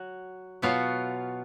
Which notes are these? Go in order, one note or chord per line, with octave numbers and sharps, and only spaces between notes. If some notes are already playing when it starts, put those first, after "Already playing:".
Already playing: F#3 F#4
B2 F#3 B3 F4